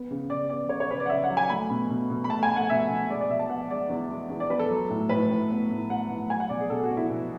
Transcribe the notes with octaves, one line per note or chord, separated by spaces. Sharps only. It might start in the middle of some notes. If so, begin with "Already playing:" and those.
Already playing: B3
C#3
C#3 D5
B3 D5
C#3 C#5
C#5
C#3 B4
D5
F#5
C#3 E5
F#5
F#3
G#5
A3 B5
B2
B2
B2
B5
A3 A5
G#5
A3
F#5
B2 E5
B2
G#3 D5
D5
B2 E5
A5
B3 F#5
G#3 D5
E2
G#3
E2
D5
B3 B4
A4
F#3
A2
A2 B4
A2
B3
A2
B3 F#5
A2
F#3 G#5
F#5
B2 D5
G#4
B2 A4
F#4
B2
E4
B2